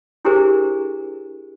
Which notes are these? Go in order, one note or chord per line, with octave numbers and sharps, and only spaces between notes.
D4 E4 G4 G#4 A#4 C5